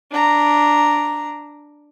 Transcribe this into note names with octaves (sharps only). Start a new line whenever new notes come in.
D4 A#5